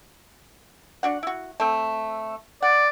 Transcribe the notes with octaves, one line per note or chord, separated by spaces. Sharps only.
D4 F#4 F#5
E4 F#4
A3 C4
D5 F#5